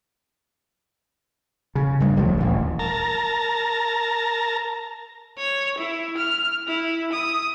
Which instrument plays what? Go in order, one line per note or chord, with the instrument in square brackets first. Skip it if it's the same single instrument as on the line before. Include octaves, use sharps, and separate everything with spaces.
[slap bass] C#3
G2 G#3
F1 D2 F3 F#3
D#1 A1
[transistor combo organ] A#4 A5 A#5
[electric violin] C#5
E4
F6
E4
D#6